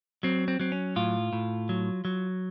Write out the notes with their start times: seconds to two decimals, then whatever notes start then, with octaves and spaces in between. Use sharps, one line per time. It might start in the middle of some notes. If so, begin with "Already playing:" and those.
0.23 F#3 C4
0.48 C4
0.60 F#3 C4
0.72 C#4
0.96 A2 F4
1.33 A2
1.69 F#3
2.05 F#3